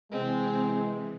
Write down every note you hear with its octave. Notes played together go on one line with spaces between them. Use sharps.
C3 E3 G#3 C4